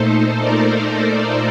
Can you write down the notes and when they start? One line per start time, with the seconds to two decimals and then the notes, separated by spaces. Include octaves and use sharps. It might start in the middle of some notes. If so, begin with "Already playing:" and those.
Already playing: A#2 A3 D#4 A4 C5
0.39 A#4 D5